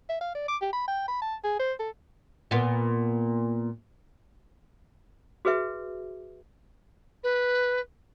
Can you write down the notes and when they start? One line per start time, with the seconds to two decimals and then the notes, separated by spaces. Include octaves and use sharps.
0.09 E5
0.21 F5
0.35 D5
0.48 D6
0.62 G4
0.73 B5
0.88 G5
1.08 B5
1.22 A5
1.44 G#4
1.60 C5
1.80 A4
2.51 A#2 B3
5.45 F#4 G#4 B4 E5
7.24 B4